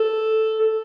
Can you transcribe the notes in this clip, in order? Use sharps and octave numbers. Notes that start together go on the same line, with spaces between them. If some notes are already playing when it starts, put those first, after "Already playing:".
Already playing: A4
A4